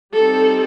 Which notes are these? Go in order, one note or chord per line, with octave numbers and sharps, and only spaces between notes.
G3 C4 D#4 A4